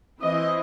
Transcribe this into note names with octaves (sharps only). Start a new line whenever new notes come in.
E3 C4 E4 D#5